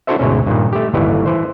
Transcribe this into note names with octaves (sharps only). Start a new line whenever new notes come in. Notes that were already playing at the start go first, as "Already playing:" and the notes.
D4 E4 F#4 A4 C5 E5
D2 G#2 B2 C#4
G2 A#2 D#3
A3 G4
G1 D#2 A2 E3 G3
E3 C5